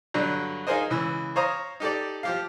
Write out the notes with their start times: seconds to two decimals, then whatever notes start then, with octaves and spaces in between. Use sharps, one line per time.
0.14 G2 D3 F#3
0.67 D#4 F4 G#4 A#4 C5 D#5
0.90 C#2 E3 E6
1.36 C5 C#5 F5 A#5 D#6
1.80 D#4 G4 A4 D5
2.23 F3 G4 F5